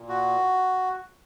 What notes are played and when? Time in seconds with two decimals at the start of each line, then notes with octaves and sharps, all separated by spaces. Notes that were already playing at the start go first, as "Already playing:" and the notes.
Already playing: A#2
0.09 F#4